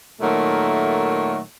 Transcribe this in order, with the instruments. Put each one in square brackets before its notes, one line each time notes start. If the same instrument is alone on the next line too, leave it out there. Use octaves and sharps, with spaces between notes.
[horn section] A#2 D#3 F#3 A3